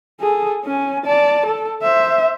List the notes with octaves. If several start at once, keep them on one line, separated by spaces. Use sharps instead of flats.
G#4 A4
C#4 G#5
D5 A5
A4
C5 E5